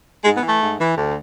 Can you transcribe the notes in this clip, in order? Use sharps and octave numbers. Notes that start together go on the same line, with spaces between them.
G#2 G#3
B3
E3
A3
G#2
E3
D2